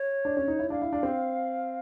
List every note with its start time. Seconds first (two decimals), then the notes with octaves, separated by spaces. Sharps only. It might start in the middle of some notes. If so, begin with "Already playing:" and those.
Already playing: C#5
0.25 D4
0.37 C#4
0.48 D#4
0.59 E4
0.70 D4 F5
0.82 E4
0.93 D4
1.03 C4